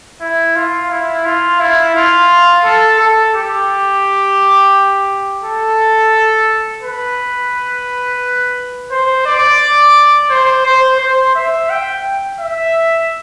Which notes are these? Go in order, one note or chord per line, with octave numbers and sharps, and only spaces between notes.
E4
F4
E4
F4
E4
F4
A4
A4
G4
A4
B4
C5
D5
C5
C5
C5
E5
G5
E5